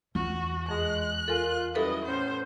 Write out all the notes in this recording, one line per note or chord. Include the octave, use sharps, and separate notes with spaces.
E2 F4 F#4
F2 G#3 F#6
F4 A4 A#4 G#5
F#2 G3 E4 A4 B4 D#5
A2 B3 C#4 C5